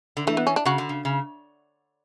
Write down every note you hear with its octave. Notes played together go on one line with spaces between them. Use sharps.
D3
E3 A3
B3
C#4
D4
C#3 F#4
D3
C#3
C#3